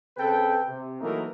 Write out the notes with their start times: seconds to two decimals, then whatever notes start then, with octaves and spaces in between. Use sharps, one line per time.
0.17 C#3 C4 A4 B4 G5
0.67 C3
1.01 E3 F#3 A3 A#3 D#4 A#4